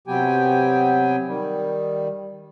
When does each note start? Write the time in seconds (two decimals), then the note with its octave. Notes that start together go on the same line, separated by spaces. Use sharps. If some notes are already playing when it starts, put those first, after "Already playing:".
0.07 C3 F#3 B3 G4 G5 G#5
1.27 D#3 G3